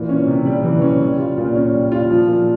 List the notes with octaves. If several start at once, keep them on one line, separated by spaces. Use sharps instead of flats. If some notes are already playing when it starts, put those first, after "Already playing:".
Already playing: A#2 E3
C#4
C3
G3
E3
C#4
G3
F4
A#2
C#4
G3
F4
F3
A#2